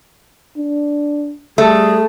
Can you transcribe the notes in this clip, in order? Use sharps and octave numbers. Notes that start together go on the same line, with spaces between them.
D4
G3 A3 G#4